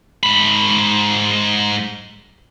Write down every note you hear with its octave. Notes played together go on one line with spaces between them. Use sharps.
G#2 B5